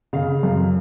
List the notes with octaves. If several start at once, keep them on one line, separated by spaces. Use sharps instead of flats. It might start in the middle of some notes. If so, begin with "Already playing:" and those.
C#3 F5
F#2